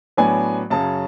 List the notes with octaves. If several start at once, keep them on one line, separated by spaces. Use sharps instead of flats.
A2 F#3 B3 D4 G#5
F#2 C#3 F#3 A5